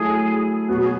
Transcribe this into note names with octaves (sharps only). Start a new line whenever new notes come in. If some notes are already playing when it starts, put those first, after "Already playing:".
Already playing: F#3 A3 E4 G#4 A4
B2 F#3 B3 F#4
G#4